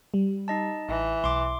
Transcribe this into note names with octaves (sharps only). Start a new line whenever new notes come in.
G3
D#4 D#5 A5
A1 E3
B1 C6 D6